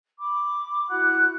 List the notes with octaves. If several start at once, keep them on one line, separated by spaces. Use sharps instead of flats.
B5 D6
E4 F#4 F#5 F#6